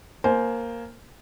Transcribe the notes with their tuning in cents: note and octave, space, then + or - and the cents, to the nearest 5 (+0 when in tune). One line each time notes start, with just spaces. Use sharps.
A#3 +0 C5 +0 G#5 +30